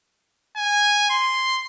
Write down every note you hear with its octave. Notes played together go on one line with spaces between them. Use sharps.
G#5
C6